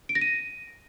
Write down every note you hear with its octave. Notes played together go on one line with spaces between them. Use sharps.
D7
A#6
D#7